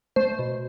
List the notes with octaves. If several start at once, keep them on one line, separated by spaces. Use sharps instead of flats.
A3 C5
B2